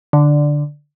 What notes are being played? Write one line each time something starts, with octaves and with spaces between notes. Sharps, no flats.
D3